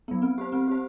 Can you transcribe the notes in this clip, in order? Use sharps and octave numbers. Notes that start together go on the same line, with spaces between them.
F#3 B3
C4
G4 C5
C4
G4 C5